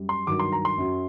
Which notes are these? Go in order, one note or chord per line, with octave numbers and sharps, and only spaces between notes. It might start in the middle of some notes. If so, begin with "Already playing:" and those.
Already playing: F#2 G3
C6
G2 D#3 F#3 D6
C6
A#5
C6
F#2 F#3